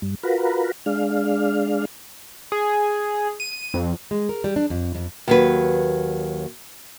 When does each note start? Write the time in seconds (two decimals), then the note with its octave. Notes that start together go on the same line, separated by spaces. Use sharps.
0.02 G2
0.23 F4 F#4 A#4 B4
0.86 G#3 D4 F5
2.52 G#4
3.40 D#7
3.74 F2
4.11 G#3
4.29 A#4
4.44 G3
4.56 D4
4.70 F2
4.95 F2
5.28 D#2 F#3 B4